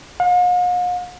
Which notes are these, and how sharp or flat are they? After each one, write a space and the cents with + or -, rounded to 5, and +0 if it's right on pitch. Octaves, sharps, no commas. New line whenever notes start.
F5 +45